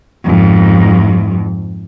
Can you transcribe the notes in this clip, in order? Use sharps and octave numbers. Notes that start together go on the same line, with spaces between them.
F2 G#2